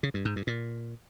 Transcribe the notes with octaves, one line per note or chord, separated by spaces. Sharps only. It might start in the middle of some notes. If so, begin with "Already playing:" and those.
C#3
G2
G#2
G2
A#2